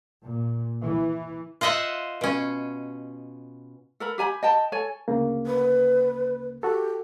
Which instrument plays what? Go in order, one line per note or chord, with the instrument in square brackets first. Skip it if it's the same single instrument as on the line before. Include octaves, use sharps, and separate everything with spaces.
[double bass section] A#2
E3
[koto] F4 C5 D#5 E5 F#5
B2 C#4
[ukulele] A4 A#4 B5
G4 G#5 A#5 B5
D#5 G5 A5
A4 C#5 G#5
[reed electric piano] D2 C#3 A#3
[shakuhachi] B4
[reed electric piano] F#4 A4 [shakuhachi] G4